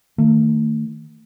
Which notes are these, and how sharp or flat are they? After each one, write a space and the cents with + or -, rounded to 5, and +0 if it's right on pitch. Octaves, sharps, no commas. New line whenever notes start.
D#3 +0 A3 +35